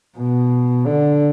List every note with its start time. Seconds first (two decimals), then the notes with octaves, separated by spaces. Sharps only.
0.18 B2
0.86 D3